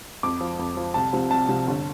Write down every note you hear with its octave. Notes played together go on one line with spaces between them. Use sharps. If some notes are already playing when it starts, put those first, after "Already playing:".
F2 D6
F3
F2
F3
C2 A5
C3 F3
C2 A5
C3 F3
G1